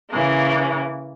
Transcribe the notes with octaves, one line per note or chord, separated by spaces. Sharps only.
C#3 E3 A#3